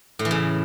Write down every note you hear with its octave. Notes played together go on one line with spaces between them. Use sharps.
A2
E3
C#3